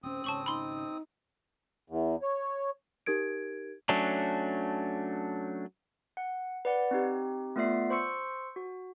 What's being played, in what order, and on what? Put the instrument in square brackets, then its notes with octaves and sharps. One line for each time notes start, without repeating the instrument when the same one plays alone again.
[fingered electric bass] D1 C#4 [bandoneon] C4 D#6 [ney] C5
[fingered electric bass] G#1 C#3 [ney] C#4 [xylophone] A5 C#6 F#7
[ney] D#4 [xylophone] B5 C6
[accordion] E2
C#5
[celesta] D#4 G4 A#4 G#6 D7
[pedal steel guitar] F#3 A3 C#4 D4
[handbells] F#5
B4 D5 F#5
C4 D#4 G4
A3 B3 F4 D5 E5 C7
C5 C6 C#6 E6 C#7
F#4